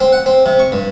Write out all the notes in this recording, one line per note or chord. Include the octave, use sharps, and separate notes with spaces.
C4
F#5
C4
C3
C#6
G2